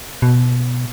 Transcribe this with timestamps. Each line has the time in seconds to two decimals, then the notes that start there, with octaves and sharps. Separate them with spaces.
0.22 B2